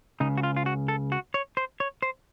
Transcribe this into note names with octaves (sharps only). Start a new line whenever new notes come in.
C#2 C#3 D#4
F#4
F4
F4
F#4
A4
F#4
C#5
C5
C#5
C5